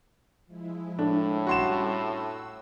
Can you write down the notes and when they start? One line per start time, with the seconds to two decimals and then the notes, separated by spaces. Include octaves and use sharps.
0.47 F3 G#3 E4
0.99 A2 A3 D4
1.47 G3 C#4 F#4 C6 E7
1.91 E6